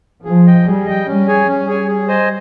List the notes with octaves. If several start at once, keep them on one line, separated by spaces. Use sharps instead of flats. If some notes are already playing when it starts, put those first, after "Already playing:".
F3 G#4
D#5 G5
G3 G#4
D#5 G5
G3 C#4
G#4 C#5 G#5
G3 C#4
G#4 C#5 G#5
G#4
C5 D#5 G#5